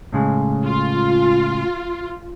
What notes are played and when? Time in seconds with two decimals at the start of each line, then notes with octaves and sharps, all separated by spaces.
0.13 A2 C#3 G#3
0.64 F4